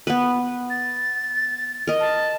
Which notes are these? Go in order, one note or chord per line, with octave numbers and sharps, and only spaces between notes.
B3 B4
A6
A#4 D#5
A5